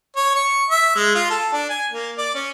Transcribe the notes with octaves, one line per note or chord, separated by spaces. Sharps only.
C#5
C#6
E5
G#3
F4
A4
D4
G#5
A#3
D5
C#4